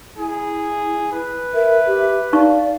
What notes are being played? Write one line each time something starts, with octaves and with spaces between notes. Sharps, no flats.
E4 G#4
B4
A#4 E5
G4
D#4 D5 F5 C#6